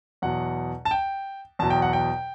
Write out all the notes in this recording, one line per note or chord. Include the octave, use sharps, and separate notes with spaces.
E2 B2 F#3 F#5
A5
G5
E2 B2 F#3 A5
G5
F#5
G5